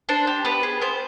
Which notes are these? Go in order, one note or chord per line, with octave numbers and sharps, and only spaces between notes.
D4 C5
G4
B3 B4
G#4
B3 C5